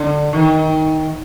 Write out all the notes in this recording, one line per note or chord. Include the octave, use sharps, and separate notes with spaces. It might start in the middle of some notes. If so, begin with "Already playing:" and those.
Already playing: D3
D#3